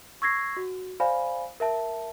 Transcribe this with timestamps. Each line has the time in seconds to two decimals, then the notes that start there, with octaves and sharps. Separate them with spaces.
0.22 C#6 E6 G#6 A#6 C7
0.57 F#4
1.00 C5 D5 F5 G#5 B5
1.60 A#4 E5 A5